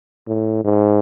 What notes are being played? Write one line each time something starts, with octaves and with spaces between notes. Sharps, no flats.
A2
G#2